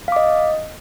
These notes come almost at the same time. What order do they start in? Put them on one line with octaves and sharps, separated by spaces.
F5 D6 D#5